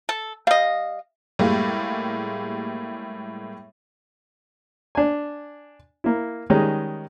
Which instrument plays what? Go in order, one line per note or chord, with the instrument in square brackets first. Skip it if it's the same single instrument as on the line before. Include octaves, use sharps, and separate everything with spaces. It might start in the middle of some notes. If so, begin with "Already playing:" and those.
[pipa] A4
[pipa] G3 D#5 [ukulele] F5
[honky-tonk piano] A2 G3 G#3 A#3
[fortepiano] D4 G#5
A#3 E4
D#3 G3 G#3 C#4 D#4